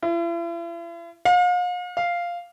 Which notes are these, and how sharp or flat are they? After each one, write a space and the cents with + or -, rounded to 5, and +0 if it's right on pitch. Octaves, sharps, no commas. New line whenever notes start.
E4 +45
F5 +40
F5 -5